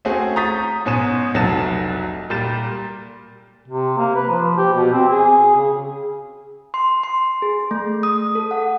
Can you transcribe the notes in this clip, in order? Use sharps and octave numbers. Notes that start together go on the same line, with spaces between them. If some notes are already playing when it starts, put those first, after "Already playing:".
A3 C4 C#4 F#4 G#4
A#5 C#6 D#6 G6 A6 B6
G#2 B2 C#4 G#5 D#6 E7
F1 C2 F#3 A5 A6 E7
A#2 G3 A#4 G6 A6 E7
C3
A#3
B4
F3
G4
B2
C4
G#4
C#3
C6
C6
G#4
A3
D#6
A4
F#5